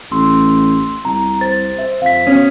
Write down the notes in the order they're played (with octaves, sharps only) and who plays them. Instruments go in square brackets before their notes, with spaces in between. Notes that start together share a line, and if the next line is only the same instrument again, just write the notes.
[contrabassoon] A1 [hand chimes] C6 E6
[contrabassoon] C2 [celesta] A#5
[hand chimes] C5 [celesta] A6
[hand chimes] C5 E5
[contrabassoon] F2 [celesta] F5 B6
[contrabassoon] B2 [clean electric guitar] C#4 [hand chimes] D#6